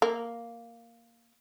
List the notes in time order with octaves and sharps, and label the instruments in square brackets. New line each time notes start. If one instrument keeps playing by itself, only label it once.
[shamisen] A#3